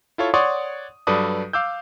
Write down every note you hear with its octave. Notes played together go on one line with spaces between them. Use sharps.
E4 F4 A4 C#5
C#5 D5 F#5 C6 C#6 D#6
G2 F#3 A4 B4 D5 D#6
F5 D6 E6 G6